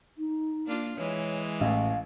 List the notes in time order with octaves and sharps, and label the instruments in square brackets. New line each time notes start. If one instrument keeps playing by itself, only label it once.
[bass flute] D#4
[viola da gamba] A#3 D4 F4
[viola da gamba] E3 G#3 [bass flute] C#5
[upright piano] A1 [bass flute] F5